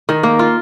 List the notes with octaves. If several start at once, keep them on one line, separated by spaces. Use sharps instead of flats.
D#3
A#3
F4